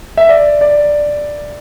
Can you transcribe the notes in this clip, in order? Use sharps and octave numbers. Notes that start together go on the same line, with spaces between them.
E5
D5
D5